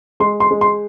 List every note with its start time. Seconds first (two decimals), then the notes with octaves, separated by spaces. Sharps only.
0.20 G#3 C6
0.40 C6
0.51 G#3
0.61 C6